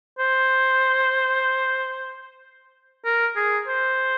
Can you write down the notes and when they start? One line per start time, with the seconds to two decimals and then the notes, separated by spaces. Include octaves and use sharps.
0.19 C5
3.05 A#4
3.36 G#4
3.68 C5